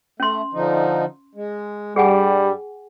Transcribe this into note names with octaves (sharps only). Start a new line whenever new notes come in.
A3 C#4 C6
D3 F3 D#4
G#3
G2 G3 G#4 F#5 G#5